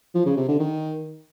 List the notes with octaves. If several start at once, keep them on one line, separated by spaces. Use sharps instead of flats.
F3
C#3
C3
D3
D#3